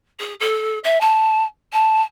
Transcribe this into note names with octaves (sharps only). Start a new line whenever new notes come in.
G#4
A4
E5
A5
A5